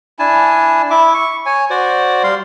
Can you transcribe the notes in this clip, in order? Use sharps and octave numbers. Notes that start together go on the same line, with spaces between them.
D4 E4 G#5 A5
E4 E5 D6
C#6
C#5 G#5
F#4 C5 D5
G3 F5 C6